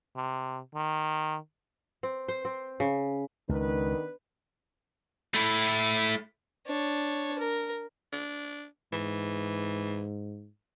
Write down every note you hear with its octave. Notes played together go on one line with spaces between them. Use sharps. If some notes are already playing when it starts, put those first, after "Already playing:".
C3
D#3
C4
C5
C4
C#3
C#2 D#3 B3 D4 B4
A3 E4
D4 C#5
A#4
D4
G#2 E3